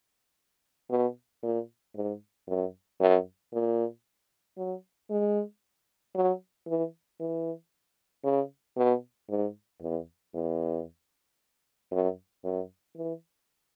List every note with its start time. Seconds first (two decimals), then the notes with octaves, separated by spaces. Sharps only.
0.90 B2
1.43 A#2
1.95 G#2
2.48 F#2
3.00 F#2
3.53 A#2
4.57 F#3
5.10 G#3
6.15 F#3
6.67 E3
7.20 E3
8.24 C#3
8.77 B2
9.29 G#2
9.82 E2
10.34 E2
11.91 F#2
12.44 F#2
12.96 E3